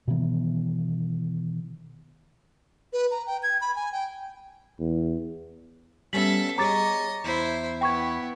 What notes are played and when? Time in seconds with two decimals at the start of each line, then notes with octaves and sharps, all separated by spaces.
0.08 B2 D#3 E3 B3
2.93 B4
3.11 A#5
3.27 G5
3.43 G#6
3.61 B5
3.76 G#5
3.92 G5
4.80 E2
6.13 G3 B3 C#4 A4 E5 B6 F#7
6.58 G3 G#4 C#5 D#5 A#5 D6 A6
7.24 E2 E4 C5
7.81 B3 E4 G5 C#6 G#6